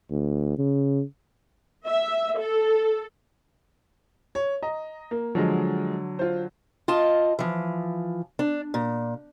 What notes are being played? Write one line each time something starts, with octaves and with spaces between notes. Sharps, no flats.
D2
C#3
E5
A4
C#5
D#5 A#5
A#3
D3 F3 F#3 G#3 D#5
F4 C5
F4 D#5 A5
E3 F3
D4
A#2